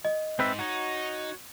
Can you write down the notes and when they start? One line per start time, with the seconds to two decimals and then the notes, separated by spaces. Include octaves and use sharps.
0.05 D#5
0.39 G#2 C4 B4 E5
0.59 D#4 F#4 C#5